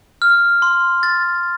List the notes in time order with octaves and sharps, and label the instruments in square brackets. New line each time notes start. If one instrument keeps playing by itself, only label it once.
[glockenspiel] F6
C6
A6